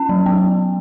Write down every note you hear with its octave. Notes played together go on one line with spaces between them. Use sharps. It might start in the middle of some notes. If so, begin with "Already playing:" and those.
Already playing: C#4
F#3
B3